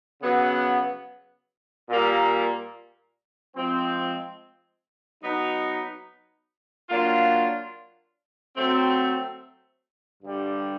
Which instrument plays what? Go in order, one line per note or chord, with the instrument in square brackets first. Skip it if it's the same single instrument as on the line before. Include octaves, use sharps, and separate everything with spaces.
[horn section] C#3 F#3 B3
A#2 G3 A#3
F3 G#3 C4
F#3 B3 D#4
F#3 A#3 D4 F4
F#3 A3 C4
G2 D3 G3